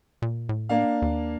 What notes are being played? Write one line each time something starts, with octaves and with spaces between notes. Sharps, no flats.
A#2
A2
A#3 D4 F5
D#2